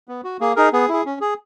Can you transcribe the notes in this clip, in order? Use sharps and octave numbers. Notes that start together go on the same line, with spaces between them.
B3
F#4
A#3 G#4
D#4 G#4 A#4
B3 G#4
E4 G#4
C#4
G#4